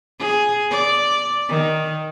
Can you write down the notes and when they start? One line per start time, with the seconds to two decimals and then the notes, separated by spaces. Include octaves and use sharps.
0.19 G#4
0.71 D5
1.49 D#3